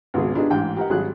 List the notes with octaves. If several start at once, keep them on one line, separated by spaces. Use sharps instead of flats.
G#1 C#2 B2 G#4
B3 D4 D#4 F4 G4 G#4
A1 G#2 G5
G4 A#4 D#5 F#5
G#1 F#3 G3 G4 G#4 F#6